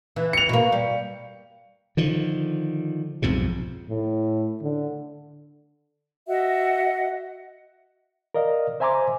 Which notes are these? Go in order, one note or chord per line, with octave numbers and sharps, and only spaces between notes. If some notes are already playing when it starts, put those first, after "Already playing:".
E3
C#7 F7
B2 A#3
G3
D3 D#3 F3
B1 F2 G#2 C3
A2
D3
F#4 D#5 E5 F#5
A#4 D5 D#5 F5
C5 E5 G#5 A#5 C6 D6